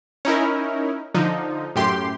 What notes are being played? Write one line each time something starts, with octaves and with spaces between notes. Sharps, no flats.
C#4 D#4 E4 A#4
D3 F3 D#4
F#2 A2 G4 C6